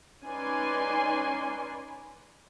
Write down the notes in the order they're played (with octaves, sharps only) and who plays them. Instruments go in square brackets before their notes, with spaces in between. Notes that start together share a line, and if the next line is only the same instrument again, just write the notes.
[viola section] C#4 D#4 B4 D5 G#5 C6